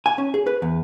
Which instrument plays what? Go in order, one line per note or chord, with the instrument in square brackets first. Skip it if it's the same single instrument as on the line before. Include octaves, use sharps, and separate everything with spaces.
[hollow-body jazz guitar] G#5
C#4
G#4
B4
E2